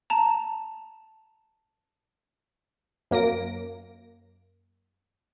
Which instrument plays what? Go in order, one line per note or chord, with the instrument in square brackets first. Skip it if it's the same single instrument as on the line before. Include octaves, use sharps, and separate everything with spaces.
[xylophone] A5 A#5
[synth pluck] F#2 A#3 A#6 D7